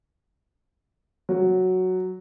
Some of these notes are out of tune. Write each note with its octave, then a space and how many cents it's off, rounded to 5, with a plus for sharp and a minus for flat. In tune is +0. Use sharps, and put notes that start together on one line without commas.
F#3 +0